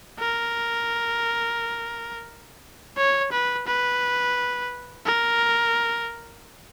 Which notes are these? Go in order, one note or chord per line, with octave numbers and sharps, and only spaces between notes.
A#4
C#5
B4
B4
A#4